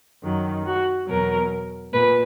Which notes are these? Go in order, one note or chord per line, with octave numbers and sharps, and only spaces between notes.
F#2 D#3 F#3
F#4
E2 B2 F#3 A#4
A#2 B4